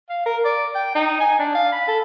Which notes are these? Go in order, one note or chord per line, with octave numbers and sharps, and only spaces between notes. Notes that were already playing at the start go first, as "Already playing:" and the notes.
F5
A#4
D5
G5
D#4
G#5
D4
F5
B5
A4